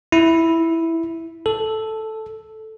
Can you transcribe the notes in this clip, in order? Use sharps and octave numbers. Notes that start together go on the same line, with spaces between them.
E4
A4